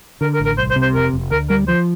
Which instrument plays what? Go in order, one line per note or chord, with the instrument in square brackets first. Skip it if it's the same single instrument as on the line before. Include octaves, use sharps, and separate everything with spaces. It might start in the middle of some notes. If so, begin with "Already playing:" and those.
[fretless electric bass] D3 [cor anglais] A#4
[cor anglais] A#4
[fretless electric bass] A1
[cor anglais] A#4
[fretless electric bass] C2 [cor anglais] C5
[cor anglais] C5
[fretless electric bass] C3
[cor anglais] C5
[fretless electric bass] F1 [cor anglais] A#4
[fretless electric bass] F1
[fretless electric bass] D2 [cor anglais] A#4
[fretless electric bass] G3 [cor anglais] A#4
[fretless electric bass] F3 [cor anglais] C5